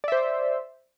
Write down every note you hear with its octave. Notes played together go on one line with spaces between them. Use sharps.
C5 D5 E5